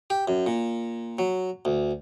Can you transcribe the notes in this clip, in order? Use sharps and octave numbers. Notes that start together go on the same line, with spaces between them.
G4
F#2
A#2
F#3
D2